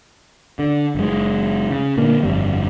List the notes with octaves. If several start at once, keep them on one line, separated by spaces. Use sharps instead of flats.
D3
F#1 G#3
C#3
A#2 D3 A#3
G1 F2 G3